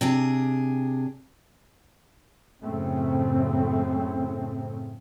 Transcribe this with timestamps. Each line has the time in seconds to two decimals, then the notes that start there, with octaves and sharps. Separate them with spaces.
0.01 C3 D4 G#4
2.63 F#2 A2 C#3 A3 C4